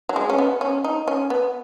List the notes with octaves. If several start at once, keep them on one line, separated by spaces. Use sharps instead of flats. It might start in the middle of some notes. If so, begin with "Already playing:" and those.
F#3
G#3
C#4
B3
C#4
D#4
C#4
B3